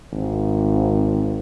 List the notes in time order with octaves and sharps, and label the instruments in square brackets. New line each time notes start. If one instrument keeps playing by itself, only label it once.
[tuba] G#1